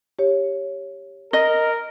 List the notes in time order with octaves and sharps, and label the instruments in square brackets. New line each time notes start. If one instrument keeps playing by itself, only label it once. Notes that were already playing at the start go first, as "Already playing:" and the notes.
[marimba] G4 C#5
[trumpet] A#4 [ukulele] D#5